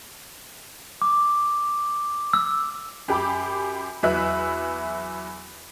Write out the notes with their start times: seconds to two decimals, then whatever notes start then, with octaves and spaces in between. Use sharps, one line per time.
1.02 D6
2.33 E6
3.08 F#2 G4 B5 D6
4.03 E2 F#3 B4 E5 F#6